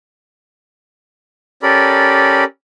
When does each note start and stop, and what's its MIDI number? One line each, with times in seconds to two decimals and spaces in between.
1.63 2.44 61
1.63 2.44 67
1.63 2.44 69
1.63 2.44 70
1.63 2.44 74
1.63 2.44 83